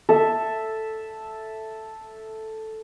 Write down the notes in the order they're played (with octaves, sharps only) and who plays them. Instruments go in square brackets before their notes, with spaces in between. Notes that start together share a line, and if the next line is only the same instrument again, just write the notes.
[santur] A4 E5